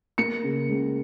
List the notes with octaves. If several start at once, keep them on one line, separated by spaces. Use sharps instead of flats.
A#3 C#7
C#3
C#2